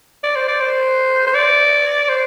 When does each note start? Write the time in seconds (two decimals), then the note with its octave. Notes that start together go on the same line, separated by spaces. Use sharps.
0.24 D5
0.36 C5
0.48 D5
0.61 C5
1.27 C5
1.35 D5
2.09 C5